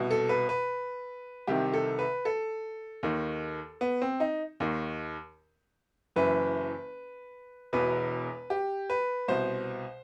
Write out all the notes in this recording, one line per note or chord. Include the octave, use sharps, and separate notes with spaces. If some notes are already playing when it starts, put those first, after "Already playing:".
Already playing: C2 B2
A4
B4
B4
C2 C3 D#3 G4
A4
B4
A4
D#2 D#3
B3
C4
D#4
D#2 D#3
F#1 F#2 E3 B4
E1 E2 B2 B4
G4
B4
C2 B2 C5